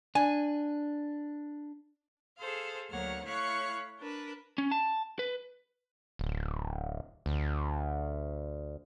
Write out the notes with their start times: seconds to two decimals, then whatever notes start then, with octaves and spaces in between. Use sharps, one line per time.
0.15 D4 G#5
2.37 G#4 A4 C5 F5
2.90 D2 F#3 A#3 C#5 F#5 F6
3.23 A3 E4 C#5 F5 C#6 F#6
3.98 D4 A#4 B4
4.58 C#4
4.71 A5
5.19 B4
6.19 D1
7.26 D2